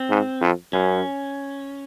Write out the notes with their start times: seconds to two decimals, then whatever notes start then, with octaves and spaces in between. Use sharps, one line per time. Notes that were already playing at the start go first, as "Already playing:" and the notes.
Already playing: C4
0.10 G#2
0.41 F2
0.73 F#2 C#4